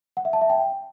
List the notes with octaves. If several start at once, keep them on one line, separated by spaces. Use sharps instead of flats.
F#5
E5
A5
E5
G5